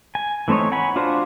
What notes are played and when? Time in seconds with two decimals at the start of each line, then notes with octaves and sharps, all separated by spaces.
0.15 G#5
0.48 E3 A3 C4 D#4 C#5
0.72 F#5 G#5 B5
0.96 D4 F4 F#4 C5